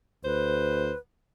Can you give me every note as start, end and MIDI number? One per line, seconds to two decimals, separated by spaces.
0.25 0.91 38
0.25 0.98 71
0.25 0.93 72